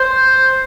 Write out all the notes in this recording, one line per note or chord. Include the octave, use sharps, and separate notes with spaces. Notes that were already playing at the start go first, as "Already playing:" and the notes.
Already playing: C5